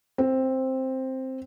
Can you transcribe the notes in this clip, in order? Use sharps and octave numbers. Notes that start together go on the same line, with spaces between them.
C4